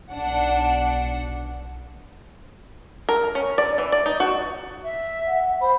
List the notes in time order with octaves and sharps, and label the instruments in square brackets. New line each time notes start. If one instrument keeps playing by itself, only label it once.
[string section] B1 D4 F#5
[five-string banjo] A#4
C#4
D5
E3
D5
D#4
F#4
[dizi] E5
[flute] F#5
[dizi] C5 [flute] B5